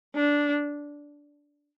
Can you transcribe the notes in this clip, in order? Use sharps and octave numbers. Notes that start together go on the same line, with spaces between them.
D4